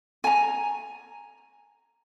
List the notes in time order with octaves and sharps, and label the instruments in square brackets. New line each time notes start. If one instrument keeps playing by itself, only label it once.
[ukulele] G#5 A#5